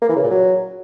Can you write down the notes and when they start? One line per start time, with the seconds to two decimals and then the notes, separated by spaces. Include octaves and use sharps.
0.02 A#3
0.09 E3
0.16 C#3
0.23 A#2
0.30 F#3